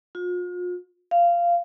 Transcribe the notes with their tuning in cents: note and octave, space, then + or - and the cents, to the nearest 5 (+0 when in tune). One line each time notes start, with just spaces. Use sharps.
F4 +40
F5 -15